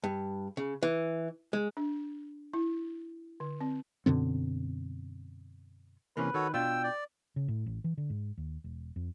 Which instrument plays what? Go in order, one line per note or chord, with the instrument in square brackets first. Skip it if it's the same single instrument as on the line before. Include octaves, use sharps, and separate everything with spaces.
[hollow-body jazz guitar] G2
C#3
E3
G#3
[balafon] D4
E4
D3
C4
[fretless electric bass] F#2 B2 D3 C4
[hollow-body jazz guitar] C3 E3 A#3 [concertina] C#4 [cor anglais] B4
[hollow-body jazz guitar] D#3 [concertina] F#4 A4 C#5
[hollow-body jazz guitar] B2 D4 F4 [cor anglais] G5 [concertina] E6
[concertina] D5
[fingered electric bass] C#3
A2
A1
E3
D3
G#2
D#2
E1
F2